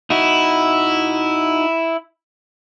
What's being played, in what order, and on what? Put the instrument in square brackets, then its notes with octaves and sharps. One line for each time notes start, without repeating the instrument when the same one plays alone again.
[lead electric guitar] D#4 F#4 [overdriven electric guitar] E4